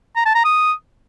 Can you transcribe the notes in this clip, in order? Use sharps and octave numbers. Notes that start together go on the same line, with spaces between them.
A#5
A5
A#5
D#6